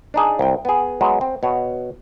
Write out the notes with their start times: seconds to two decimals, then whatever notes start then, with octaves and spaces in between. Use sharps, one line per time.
0.14 D4 D#4 G#4
0.39 C2 G5
0.65 B3 G#4
1.01 F#3 G#3 B3
1.21 C4
1.43 B2 C#5